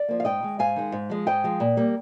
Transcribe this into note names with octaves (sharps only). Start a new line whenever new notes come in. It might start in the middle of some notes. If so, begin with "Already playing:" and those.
Already playing: D5
F3 A#3
F5
G#2 D#5 G5
D#3 G#3
G#2 F5 G#5
D#3 G#3
G#2
F3 G#3
G#2 D#5 G5
F3 G#3
A#2
G3 A#3